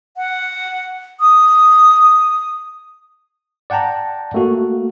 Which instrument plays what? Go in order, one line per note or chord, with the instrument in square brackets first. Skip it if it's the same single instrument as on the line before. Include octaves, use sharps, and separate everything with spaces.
[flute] F#5
D#6
[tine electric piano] D5 F#5 G5 A5 A#5
A3 A#3 F#4